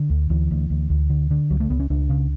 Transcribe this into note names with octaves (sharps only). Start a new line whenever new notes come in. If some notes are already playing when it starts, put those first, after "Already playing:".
Already playing: D3
D2
D2 E3
D2
D2
D2
D3
D3
C#2 F#3
A3
C#2 B3
C#4
C#2 D4
C#3